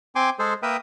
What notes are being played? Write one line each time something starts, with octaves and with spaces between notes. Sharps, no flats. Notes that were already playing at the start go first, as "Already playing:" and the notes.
C4 G5 G#5 C6 D6
G#3 G#4 A4 C5
A#3 A#4 B4 E5 G5 D#6